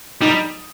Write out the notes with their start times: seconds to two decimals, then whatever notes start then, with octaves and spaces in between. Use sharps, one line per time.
0.21 G3 D#4